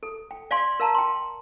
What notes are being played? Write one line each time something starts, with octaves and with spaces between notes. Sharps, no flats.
A4
G5
D5 F5 G5 G#5 C6
A#4 F5 A5 A#5
G5 C6